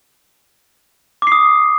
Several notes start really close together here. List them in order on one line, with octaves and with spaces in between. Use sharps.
D6 C7 D#6